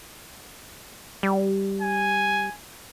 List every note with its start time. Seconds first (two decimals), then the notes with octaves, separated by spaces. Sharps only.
1.23 G3
1.81 G#5